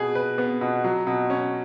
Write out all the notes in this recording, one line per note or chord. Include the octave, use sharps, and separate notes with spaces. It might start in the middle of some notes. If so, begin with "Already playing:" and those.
Already playing: B2 G#4
B4
B3
B2
F#3
B2
C#4